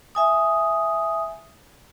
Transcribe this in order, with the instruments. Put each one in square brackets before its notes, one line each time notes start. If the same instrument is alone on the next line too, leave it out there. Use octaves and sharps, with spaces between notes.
[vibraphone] E5 G#5 D#6